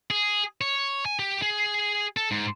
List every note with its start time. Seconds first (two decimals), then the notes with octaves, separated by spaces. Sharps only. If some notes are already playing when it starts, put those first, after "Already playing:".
0.10 G#4
0.61 C#5
1.06 G#5
1.19 G4
1.42 G#4
2.17 A4
2.31 G#2